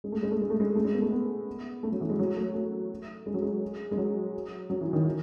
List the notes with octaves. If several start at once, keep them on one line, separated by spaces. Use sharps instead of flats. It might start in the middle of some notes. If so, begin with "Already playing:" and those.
G#3
A3
G#3
A3
G#3
A3
G#3
A3
G#3
B3
A3
B3
A3
F#3
E3
G#3
F#3
A3
A3
G#3
F#3
G#3
G#3
F#3
F#3
E3
D#3
E3